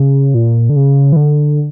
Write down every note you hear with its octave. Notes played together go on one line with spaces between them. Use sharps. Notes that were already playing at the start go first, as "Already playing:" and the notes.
Already playing: C#3
A#2
D3
C#3
E3
D3